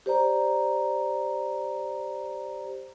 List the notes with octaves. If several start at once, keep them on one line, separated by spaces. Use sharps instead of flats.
G4 C5 D5 A#5